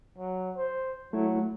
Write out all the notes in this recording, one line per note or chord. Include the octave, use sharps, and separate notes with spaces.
F#3
C5
F#3 A3 E4